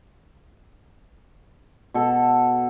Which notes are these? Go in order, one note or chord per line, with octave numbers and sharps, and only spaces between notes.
B2 A4